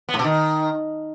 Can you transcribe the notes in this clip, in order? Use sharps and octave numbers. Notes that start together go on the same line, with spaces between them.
B3
A2
B2
D#3